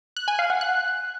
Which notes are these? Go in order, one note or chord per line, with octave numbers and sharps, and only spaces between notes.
F#6
G#5
F5
F#5
F#6